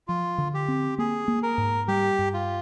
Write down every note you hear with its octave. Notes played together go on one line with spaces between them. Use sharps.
F3 F4
D3
G4
C4
A#3 G#4
A#3
A#4
G#2
G3 G4
G2
F4